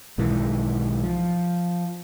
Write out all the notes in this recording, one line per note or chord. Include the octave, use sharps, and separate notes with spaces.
B1 G#2 D#3 E3
F3